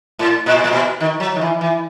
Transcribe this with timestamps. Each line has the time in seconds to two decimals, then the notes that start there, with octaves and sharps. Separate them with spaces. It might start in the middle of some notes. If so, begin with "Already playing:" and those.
0.19 A2
0.46 A#2
0.55 B2
0.64 A#2
0.73 B2
1.00 D#3
1.20 F#3
1.36 D#3
1.41 E3
1.61 E3